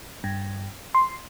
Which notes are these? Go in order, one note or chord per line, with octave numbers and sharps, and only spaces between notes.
G2
C6